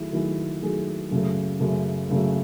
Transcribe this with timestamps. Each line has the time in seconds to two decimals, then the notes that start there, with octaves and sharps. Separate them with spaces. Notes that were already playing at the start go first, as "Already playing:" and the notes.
Already playing: D#3 F#3 A3 E4 G#4
0.12 D#3 F#3 A3 E4 G#4
0.62 D#3 F#3 A3 E4 G#4
1.11 F#2 C#3 F#3 A3
1.60 F#2 C#3 F#3 A3
2.09 F#2 C#3 F#3 A3